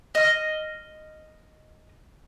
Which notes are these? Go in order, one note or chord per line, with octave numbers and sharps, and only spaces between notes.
D#5 F6